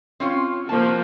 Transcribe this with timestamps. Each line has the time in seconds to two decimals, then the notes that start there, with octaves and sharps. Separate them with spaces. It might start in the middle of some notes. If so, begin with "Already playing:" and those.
0.20 C4 C#4 F4
0.69 C3 F3 A#3 F#4 A5